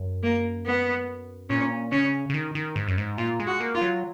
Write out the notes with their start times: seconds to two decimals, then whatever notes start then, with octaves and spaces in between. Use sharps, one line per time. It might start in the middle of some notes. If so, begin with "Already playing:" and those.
Already playing: F#2
0.23 A#3
0.65 B3
1.49 A#2 C#4
1.91 C#3 C#4
2.30 C#3
2.34 D#3
2.55 D#3
2.76 G#2
2.88 F#2
2.97 G#2
3.18 A#2 F4
3.40 G#3
3.47 F#4
3.60 A#3
3.75 F4
3.81 F#3